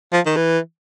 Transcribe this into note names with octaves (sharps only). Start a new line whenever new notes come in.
F3
D#3
E3